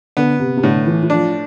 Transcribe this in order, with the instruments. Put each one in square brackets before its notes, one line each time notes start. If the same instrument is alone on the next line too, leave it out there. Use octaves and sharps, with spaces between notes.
[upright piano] D3 [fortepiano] B3
[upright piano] C3
C3
[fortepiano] A2 [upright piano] D3
[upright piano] E3
E3
[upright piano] F3 [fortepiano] D4